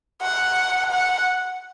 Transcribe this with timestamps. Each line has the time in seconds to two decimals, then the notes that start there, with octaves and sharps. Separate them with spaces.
0.22 F#5
0.91 F#5